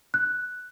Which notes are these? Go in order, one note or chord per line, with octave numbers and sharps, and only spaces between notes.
F#6